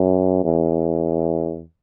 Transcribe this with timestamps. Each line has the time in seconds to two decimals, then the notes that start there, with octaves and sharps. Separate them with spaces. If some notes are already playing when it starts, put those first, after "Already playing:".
Already playing: F#2
0.44 E2